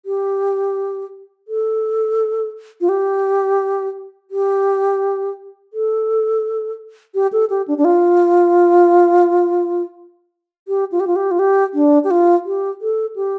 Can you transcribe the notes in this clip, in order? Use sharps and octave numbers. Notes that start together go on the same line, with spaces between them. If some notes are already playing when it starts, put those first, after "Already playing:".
G4
A4
F4
G4
G4
A4
G4
A4
G4
D4
D4
F4
G4
F4
G4
F4
G4
F4
G4
D4
G4
F4
G4
A4
G4